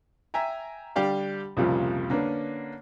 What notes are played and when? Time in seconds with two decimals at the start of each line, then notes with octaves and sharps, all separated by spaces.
0.34 E5 G5 G#5 A#5
0.96 D3 G3 G4 D5 F5
1.57 C2 F2 A#2 C#3 F3 G3
2.10 D3 A#3 B3 C#4 D4